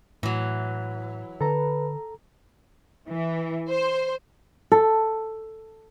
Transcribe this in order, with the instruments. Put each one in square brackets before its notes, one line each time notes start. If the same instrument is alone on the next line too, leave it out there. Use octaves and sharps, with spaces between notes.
[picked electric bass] A2 [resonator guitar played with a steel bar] E3 F#3
[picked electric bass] D3 [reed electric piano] A4 A#5 [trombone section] B4
[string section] E3
C5
[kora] A4